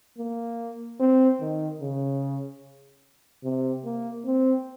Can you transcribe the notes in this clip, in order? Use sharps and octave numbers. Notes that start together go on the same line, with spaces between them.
A#3
C4
D#3
C#3
C3
A#3
C4